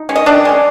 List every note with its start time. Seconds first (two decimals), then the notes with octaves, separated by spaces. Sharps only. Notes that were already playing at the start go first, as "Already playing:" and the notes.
Already playing: D#4
0.09 G#3 C#4
0.16 D#5
0.26 D#3 D4 D5
0.45 G#3 C#4